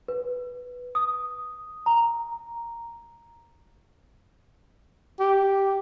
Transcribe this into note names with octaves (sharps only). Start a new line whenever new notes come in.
B4
D#6
A#5
G4